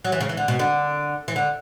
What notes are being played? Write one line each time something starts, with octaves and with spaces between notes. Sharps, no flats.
F#3
E3
C#3
E3
D3
B2
D3
E3
D3